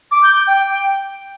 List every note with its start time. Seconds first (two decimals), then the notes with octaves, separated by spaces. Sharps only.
0.11 D6
0.23 G6
0.35 G6
0.47 G5